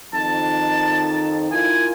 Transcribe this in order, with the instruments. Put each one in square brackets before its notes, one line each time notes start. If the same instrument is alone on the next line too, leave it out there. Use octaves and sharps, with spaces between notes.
[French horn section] F2 D#3 D#4 [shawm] A5
[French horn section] E4 F4 A#4 [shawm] G#5